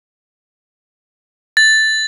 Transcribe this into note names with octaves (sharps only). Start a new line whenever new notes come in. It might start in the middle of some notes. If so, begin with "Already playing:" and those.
A6